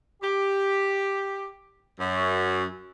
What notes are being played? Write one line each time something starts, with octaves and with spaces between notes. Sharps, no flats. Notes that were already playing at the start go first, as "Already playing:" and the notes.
G4
F#2